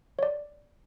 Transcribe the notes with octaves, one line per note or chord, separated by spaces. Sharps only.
C#5 D5